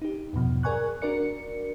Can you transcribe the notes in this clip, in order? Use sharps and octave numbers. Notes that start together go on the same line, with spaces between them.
D#4 G4
E2 G2 B2 F3
G#4 A#4 D5 G#5 C#6 F#6
D4 F#4 A#4 D5 C#7